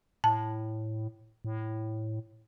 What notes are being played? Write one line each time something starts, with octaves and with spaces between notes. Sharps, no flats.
A2 A5
A2